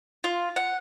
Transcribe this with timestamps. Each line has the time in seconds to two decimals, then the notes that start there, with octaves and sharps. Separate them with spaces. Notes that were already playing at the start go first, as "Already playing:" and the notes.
0.24 F4
0.56 F#5